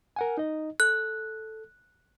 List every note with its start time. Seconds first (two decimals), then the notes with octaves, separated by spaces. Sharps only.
0.16 A#4 F#5 G#5
0.38 D#4 D#5
0.80 A4 F#6